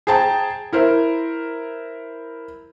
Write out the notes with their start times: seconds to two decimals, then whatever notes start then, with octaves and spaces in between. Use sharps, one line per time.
0.07 G#4 C5 G5 A5 A#5
0.73 E4 A#4 C5